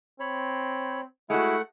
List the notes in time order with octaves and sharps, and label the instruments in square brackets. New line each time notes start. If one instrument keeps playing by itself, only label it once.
[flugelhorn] C4 [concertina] C#5 B5
[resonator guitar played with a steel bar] G#3 F#4 [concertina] A3 F#5 [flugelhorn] E4